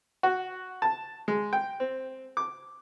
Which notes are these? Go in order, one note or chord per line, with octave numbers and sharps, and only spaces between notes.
F#4
A5
G#3
G5
C4
D6